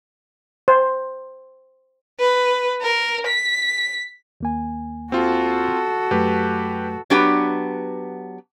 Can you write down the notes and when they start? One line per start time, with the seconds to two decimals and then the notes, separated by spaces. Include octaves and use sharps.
0.68 C5
2.19 B4
2.82 A#4
3.26 B6
4.41 D#2 A#3 G#5
5.12 C4 F4 F#4 A4
6.11 F#2 F#3 A3 G4 B4
7.10 F#3 B3 D4 G4 B4 F#5